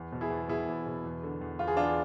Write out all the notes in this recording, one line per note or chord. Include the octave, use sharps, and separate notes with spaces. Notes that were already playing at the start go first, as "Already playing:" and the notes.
Already playing: E2 E3
B2
E4 G#4
E2
B2 E4 G#4
E2
B2
E2
D3
E2
E2 F4
G#4
E2 D4 F4